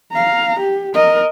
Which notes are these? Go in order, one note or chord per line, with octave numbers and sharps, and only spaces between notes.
F5 A#5
G4
A#4 D#5